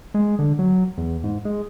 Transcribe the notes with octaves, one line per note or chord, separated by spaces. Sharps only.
G#3
D3
F#3
E2
G#2
G#3